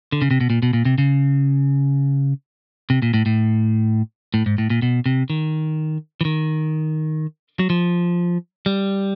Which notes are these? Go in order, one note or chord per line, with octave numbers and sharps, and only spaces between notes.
D3
C#3
C3
B2
A#2
B2
A#2
C3
C#3
C3
A#2
A2
A2
A2
G#2
A2
A#2
B2
C3
D#3
E3
D#3
F#3
F3
G3